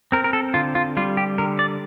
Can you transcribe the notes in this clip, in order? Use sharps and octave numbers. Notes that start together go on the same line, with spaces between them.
C4 A#4
A#4
A4
D3 F4
F4
G3 F4
G4
D3 A#4
D5